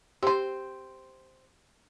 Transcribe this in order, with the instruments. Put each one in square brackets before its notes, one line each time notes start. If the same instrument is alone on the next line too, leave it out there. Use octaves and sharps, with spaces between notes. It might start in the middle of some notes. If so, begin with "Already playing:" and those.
[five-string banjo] C4 C5 [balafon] G4